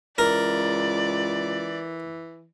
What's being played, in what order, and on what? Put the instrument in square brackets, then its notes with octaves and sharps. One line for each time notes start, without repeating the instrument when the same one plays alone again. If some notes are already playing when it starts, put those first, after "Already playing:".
[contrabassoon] C#2 [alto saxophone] E3 [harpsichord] A#4 [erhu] D5